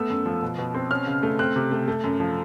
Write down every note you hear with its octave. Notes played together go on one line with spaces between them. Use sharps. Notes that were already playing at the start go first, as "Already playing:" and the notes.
Already playing: A3 B3 E6
F#2
F3
B2
B2
C4
C#4 F6
C#3
A3
C4 F#6
C3
A3
A3
F#2
F3